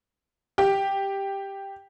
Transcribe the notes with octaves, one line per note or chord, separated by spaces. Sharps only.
G4